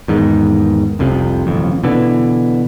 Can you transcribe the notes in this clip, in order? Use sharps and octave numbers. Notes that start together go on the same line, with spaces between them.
E2 G#2 D#3
F1 C2 F2 C3
D#1 A1 F2
B2 D3 E3